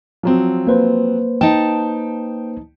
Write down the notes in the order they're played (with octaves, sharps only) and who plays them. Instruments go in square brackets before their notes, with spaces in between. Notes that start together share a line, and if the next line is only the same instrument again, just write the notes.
[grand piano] F3 F#3 C4
[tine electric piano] A#3 B4 C5
[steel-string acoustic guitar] D#4 A5 [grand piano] G5